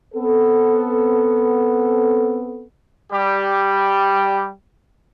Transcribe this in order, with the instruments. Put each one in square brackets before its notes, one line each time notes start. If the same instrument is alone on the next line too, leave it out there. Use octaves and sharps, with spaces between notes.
[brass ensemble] B3 C4 A4
[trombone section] G3 G4